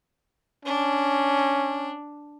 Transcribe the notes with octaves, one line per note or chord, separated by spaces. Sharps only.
C#4 D4